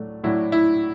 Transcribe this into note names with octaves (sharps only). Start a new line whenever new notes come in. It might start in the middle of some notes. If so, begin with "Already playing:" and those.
Already playing: A2 F#3 A3 D4
A2 F#3 D4 E4
E4